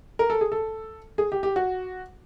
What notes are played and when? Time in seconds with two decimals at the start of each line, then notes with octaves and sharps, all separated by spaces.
0.19 A#4
0.30 A4
0.41 G#4
0.52 A4
1.18 G#4
1.32 G4
1.43 G4
1.56 F#4